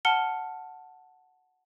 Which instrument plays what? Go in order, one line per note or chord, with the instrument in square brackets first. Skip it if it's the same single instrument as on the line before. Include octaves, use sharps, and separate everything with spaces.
[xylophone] F#5 A5 F6 C#7 G7